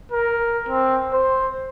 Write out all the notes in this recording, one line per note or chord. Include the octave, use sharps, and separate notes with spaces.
A#4
C4
C5